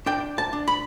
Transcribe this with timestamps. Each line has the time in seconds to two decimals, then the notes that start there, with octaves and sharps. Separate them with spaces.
0.06 D4 G5
0.38 A5
0.53 D4
0.68 B5